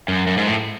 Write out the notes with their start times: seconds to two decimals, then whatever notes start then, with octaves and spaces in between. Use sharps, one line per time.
0.08 F#2
0.27 F#2
0.37 G#2
0.47 A2